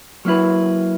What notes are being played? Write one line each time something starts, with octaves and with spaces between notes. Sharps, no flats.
F#3 A#3 E4 B4